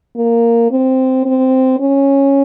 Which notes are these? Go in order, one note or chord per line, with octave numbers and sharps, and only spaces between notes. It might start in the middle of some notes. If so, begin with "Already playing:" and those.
A#3
C4
C4
C#4